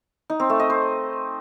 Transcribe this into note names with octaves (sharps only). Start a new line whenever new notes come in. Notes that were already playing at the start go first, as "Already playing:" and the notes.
D#4
C4
A3
D#5
C5